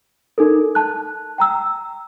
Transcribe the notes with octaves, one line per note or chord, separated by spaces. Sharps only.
D#4 A4 A#4
A5 F#6
G5 A#5 E6